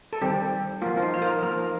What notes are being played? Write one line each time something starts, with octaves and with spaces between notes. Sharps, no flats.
A4
D#3 G3 C4 G4
F3 A#3 F4
F4
D#4
C5
A#4
F3 A#3 A#4